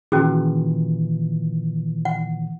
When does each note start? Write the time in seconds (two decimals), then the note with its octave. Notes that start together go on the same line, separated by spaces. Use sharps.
0.12 A#2 D#3 E3 C#4 F#4 G#4
2.05 F#5